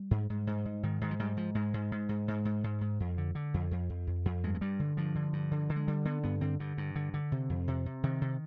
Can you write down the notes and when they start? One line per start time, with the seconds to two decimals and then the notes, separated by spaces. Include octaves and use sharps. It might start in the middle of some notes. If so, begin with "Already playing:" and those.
Already playing: G3
0.11 G#2
0.30 G#2
0.47 G#2
0.66 G#2
0.83 G#2 D#3
1.01 G#2 D#3
1.11 F3
1.19 G#2 G3
1.37 G#2 F3
1.55 G#2 G#3
1.74 G#2
1.92 G#2
2.09 G#2
2.28 G#2
2.45 G#2
2.64 G#2
2.81 G#2
3.00 F2
3.18 D3
3.35 D3
3.54 F2
3.71 F2
3.90 F2
4.07 F2
4.26 F2
4.43 G2 G#3
4.55 G#3
4.61 G2 G3
4.79 D3
4.97 G2 F3
5.15 D3
5.33 G2
5.51 D3
5.69 D3
5.76 G#3
5.88 D3 G3
6.05 D3 B3
6.23 G2 B3
6.41 D3 C4
6.59 G2 D3
6.78 G2
6.95 D3
7.14 D3
7.32 C3
7.50 F2
7.68 C3
7.86 C3
8.03 C3 D#3
8.21 C3